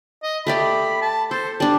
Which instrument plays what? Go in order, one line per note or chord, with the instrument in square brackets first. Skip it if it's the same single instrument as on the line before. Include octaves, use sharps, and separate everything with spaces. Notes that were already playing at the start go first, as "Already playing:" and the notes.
[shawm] D#5
[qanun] A3 G4 D5 [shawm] B5
[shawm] A5
[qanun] A4 [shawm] C5
[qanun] G3 D4 [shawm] A5